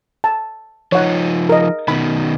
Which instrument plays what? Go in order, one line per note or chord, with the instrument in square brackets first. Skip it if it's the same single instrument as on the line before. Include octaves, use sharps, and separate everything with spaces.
[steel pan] A5
[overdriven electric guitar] F3 D#4 [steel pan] C#5 F#5
[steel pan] A#4 D#5
[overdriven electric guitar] B2 D#3 [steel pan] B5